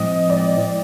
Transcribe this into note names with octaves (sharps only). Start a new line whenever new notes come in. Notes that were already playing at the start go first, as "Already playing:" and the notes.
Already playing: A2 F3 G#3 C4 D#5
D5